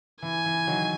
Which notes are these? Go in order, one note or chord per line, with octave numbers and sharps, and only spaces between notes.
E3 G#5
E3
D#3 F#3